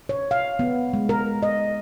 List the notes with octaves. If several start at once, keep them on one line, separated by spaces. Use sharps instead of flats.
C#5
F5
B3
G#3
A#4
D#5